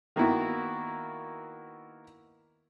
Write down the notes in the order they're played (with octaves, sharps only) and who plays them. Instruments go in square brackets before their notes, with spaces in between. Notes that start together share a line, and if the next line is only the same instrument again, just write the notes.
[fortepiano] D#3 A#3 B3 E4 F#4